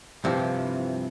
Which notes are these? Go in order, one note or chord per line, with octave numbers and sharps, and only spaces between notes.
G2 C3 E3 F3